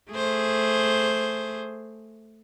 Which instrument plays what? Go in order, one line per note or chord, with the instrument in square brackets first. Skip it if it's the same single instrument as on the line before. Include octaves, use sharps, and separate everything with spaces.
[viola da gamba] A3 G#4 C5